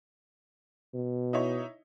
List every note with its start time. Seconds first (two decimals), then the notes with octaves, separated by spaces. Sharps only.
0.95 B2
1.33 D#4 E4 C#5